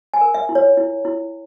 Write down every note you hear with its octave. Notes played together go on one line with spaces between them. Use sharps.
G#5
A#4
E5
E4
C#5
E4
E4